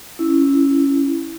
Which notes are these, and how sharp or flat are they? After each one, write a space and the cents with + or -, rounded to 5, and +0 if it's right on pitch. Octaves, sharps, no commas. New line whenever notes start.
C#4 +0 E4 +0